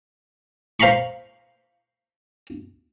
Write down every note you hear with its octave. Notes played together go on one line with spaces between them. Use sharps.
C5 F5 A#5 B5 C#6